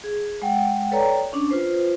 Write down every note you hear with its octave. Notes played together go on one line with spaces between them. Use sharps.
G#4
G#3 F#5 G5
A4 B4 C#5 D5 G5 A#5
C#4 D4
F4 B4 C5